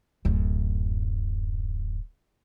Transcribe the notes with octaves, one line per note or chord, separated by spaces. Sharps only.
D1 F#2